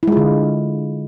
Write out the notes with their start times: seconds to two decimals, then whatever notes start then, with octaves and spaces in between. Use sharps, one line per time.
0.03 E4
0.08 G#3
0.12 F4
0.17 D3